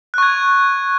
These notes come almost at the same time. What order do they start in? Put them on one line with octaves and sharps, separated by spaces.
F#6 C#6 G#6